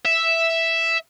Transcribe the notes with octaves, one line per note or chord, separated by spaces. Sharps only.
E5